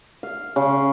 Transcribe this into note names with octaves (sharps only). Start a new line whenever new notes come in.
F5
C#3